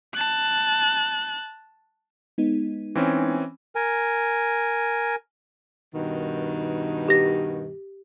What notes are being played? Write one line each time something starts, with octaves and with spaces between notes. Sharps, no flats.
A5 F#6
G#3 B3 D#4
E3 C4 C#4
A#4 G#5
G2 B2 D#3
G4 A#6